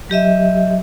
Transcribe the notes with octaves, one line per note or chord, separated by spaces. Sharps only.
F#3 G4 D#5 E5